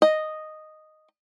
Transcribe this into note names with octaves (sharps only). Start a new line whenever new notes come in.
D#5